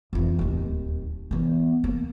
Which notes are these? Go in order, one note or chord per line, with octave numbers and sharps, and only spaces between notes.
F2 E3
D1 D#2
E3 B3
A#3